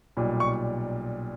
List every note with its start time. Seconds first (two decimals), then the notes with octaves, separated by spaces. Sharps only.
0.17 B1 A#2 G3
0.40 C#6